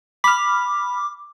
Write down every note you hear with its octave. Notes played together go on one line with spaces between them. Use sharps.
B5 D6 F6